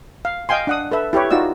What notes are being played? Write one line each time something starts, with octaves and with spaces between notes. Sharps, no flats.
F5
D#5 F5 G5 G#5 C6
D4 F#5 D#6
A4 B4 E5
E4 G4 B4 C#5
D#4 F4 F#4 D5 E6